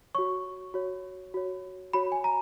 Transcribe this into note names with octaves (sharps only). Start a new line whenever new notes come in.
F#4 C#5 C#6
F#4 C#5
F#4 C#5
F#4 C#5 B5
G#5
A#5